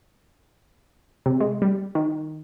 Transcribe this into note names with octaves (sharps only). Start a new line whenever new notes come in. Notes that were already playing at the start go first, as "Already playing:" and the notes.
C3
G#3
G3
D#3